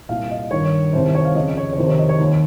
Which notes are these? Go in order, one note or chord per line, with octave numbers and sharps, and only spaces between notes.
C2 A#2 F5
D#5
G2 D#3 C#5
C2 C3 D#3 C5
C5
C#5
F5
F2 C#3 D#5
C#5
C#5
F2 C3 D#3 C5
C#5
D#5
C#5
D#2 D#3